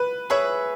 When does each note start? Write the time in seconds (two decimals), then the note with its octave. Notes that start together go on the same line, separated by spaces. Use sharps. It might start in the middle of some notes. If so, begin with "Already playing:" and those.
Already playing: B4
0.30 G#4 B4 C#5 E5